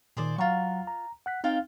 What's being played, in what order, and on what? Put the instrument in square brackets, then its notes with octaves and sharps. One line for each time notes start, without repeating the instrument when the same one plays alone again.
[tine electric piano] A#2 D#3 [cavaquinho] G#4 C5 D5
[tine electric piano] F#3 F#5 A#5 [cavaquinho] F4 C#6
[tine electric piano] A#5
F#5 F#6 B6
[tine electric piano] C4 D#4 [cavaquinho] F4 F5 G5